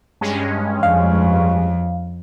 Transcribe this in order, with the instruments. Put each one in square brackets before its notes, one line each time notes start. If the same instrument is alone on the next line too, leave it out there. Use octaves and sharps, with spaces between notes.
[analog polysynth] G2 G#3 C#4
[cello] F2 [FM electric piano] F5